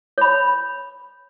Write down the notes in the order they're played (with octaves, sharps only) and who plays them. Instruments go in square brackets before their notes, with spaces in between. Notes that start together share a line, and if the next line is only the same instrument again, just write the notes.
[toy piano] C#5 B5